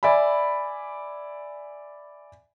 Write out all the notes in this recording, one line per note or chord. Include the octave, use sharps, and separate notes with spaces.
D5 E5 G#5 B5